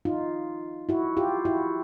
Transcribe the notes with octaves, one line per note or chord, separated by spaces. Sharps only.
D#4 F4
E4 F#4
F4 G4
E4 F#4